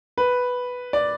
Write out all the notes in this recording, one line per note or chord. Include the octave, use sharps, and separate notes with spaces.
B4
D5